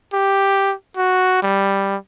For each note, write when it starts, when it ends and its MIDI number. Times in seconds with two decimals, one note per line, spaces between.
0.13 0.74 67
0.97 1.41 66
1.43 1.96 55